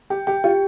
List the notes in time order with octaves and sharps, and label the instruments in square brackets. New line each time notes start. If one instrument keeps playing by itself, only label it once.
[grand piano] G4 [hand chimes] G5
[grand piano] G4 [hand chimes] G5
[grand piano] F4 [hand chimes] G4